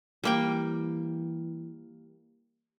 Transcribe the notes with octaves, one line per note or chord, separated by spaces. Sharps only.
E3 G3 A#3 G5